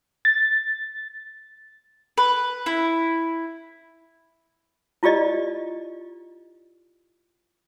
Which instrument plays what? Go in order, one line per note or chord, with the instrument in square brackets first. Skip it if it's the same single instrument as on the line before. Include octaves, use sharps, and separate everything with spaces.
[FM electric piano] A6
[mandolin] B4
E4
[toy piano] E4 F4 G4 D5 D#5